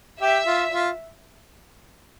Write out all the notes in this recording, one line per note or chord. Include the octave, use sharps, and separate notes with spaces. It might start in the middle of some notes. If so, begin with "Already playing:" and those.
G4 E5
F4
F4